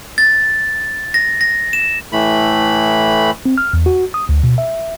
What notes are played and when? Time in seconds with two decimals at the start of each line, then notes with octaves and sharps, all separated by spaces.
0.18 A6
1.14 A#6
1.41 A#6
1.73 E7
2.12 A2 E3 A3 B5
3.46 C4
3.58 F6
3.73 E2
3.86 F#4
4.14 D#6
4.29 D2
4.44 B2
4.58 E5